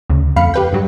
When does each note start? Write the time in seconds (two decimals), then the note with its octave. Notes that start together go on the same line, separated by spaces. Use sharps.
0.10 D2 C#3
0.36 F2 A3 F5 B5 C#7
0.54 G4 B4 G5
0.72 G2 F#3 G3